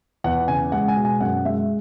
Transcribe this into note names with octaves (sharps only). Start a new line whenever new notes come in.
E2 F#5
C#3 G#5
G#3 F#5
G#5
B2
G#5
F#2 F#5
G#3 E5